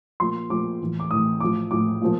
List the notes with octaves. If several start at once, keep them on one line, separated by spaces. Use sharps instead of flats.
A#2 F3 C6
A#2 F3 D6
A2 E3
D6
A2 E3 D#6
A2 F3 D6
A2 F3 D6
A#2 F3